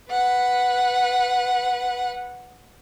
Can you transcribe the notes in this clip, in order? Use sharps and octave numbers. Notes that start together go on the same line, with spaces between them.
B4 F#5